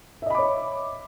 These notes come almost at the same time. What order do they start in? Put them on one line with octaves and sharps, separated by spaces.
E5 D#5 B5 D6 C#5